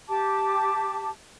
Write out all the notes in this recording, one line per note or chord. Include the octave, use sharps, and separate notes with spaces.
G4 A5 D6